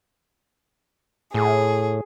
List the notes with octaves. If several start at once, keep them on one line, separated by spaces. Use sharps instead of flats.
A2 G#4